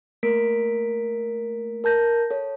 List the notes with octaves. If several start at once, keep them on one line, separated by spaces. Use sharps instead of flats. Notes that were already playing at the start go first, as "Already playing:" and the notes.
A3 A#3 A#4 B6 D7
A#4 A5 G6 A#6
A4 C#5